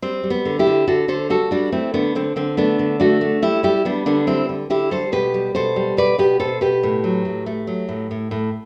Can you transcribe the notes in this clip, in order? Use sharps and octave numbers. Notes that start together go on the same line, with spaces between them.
G3 C4
G3
B3
D3
E4 G4
D3
D3 F#4 A4
D3 A4 C5
G3 F#4 A4
G3 D4 F#4
A3 C4 E4
D3 B3 D4
D3 C4
D3 C4
A3 B3 D4
D3
A3 D4 F#4
A3
G3 E4 G4
G3 E4 G4
G3 B3 D4
D3 B3 D4
G3 C4 E4
D3
D3 E4 G4
G3 A4 C5
B2 G4 B4
G3
B2 A4 C5
G3
B2 B4 D5
B2 G4 B4
B2 A4 C5
B2 G4 B4
A2
F#3
A2
A3
F#3
A2
A2
A2